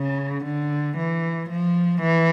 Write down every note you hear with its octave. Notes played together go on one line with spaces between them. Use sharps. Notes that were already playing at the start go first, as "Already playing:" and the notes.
Already playing: C#3
D3
E3
F3
E3